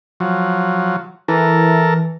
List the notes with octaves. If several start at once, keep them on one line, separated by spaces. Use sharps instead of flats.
F3 F#3
E3 A4 A#4